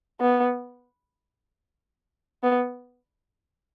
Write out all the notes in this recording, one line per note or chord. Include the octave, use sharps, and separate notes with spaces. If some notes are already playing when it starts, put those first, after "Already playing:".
B3
B3